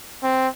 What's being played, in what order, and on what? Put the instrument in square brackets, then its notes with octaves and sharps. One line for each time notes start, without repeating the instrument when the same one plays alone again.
[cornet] C4